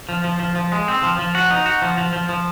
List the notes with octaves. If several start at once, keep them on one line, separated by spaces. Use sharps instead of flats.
F3
F3
F3
F3
G#3
C4
F3
F3
F#4
D#4
F#4
F3
F3
F3
F3